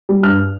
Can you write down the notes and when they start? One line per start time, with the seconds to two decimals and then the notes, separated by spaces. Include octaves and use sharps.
0.09 G3
0.23 G2 F6